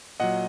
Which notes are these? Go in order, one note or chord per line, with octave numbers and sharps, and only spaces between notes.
A#2 F#3 D#5 F#5